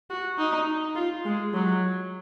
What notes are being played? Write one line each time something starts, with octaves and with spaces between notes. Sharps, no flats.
F#4
D#4
F4
G#3
F#3